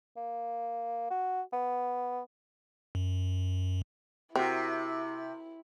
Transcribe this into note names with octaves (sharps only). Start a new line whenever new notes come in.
A#3
F#4
B3
F#2
C3 C4 E4 F#4 A#4